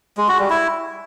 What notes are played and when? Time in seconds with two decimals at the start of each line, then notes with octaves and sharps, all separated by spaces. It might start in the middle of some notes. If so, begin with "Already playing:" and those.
0.17 G#3
0.28 F#4
0.39 G3
0.50 E4